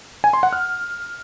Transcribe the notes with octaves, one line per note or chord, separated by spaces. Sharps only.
G#5
C6
F#5
F6